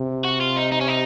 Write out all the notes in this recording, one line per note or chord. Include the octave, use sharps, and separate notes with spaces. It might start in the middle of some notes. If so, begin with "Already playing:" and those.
Already playing: C3
F#4
F4
D#4
D#4
C#4
D#4